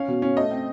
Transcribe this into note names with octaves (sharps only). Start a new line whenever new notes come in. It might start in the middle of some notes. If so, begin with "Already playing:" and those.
Already playing: C#4 F5
B2
C#4
A3 D#5
C4